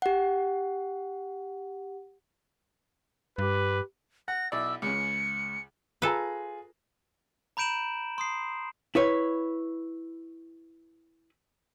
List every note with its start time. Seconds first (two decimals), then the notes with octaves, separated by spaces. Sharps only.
0.02 G4 F#5
3.38 G2 G4 B4
4.28 F#5 A#6
4.52 B1 E4 D5 E6
4.82 C#2 C#3 C#7
6.02 F4 G#4 A4 B4 A#5
7.57 A#5 B5 G6 D7 E7 F#7
8.18 C6 D#6 C7
8.95 E4 B4 C#5